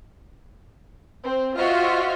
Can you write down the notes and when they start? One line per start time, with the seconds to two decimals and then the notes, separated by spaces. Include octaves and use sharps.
1.23 C4
1.56 F4 F#4 C5 D#5 E5 F6